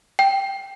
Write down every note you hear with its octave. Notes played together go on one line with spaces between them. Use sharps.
G5